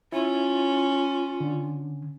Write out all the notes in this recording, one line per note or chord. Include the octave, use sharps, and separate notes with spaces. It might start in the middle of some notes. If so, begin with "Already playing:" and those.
C#4 E4 F4
D3